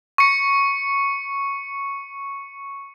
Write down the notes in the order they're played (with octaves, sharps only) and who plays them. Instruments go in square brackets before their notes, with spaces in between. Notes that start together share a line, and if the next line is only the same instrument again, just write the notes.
[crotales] C#6 C#7